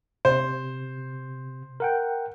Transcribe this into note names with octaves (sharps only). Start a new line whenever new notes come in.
C3 C5
A#4 F#5 G5